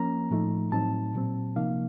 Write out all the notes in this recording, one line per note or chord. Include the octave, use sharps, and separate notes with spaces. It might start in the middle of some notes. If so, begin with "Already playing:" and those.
Already playing: F3 A#3 C#4 A#5
A2 F3 A3 D#4
A2 F#3 C4 D#4 A5
A#2 F#3 C4
C3 F3 A#3 D#4 F5